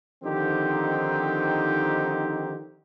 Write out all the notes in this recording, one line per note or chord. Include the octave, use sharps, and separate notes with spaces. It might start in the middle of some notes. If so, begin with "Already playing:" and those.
D3 D#3 F3 C4 D#4 G4